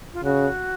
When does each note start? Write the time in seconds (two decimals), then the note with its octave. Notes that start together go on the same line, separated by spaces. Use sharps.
0.13 F4
0.23 C#3 F#4